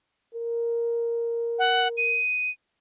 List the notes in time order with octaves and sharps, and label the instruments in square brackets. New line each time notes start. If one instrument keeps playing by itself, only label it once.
[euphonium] A#4
[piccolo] F#5
D#7